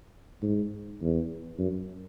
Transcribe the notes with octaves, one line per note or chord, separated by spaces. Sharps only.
G#2
E2
F#2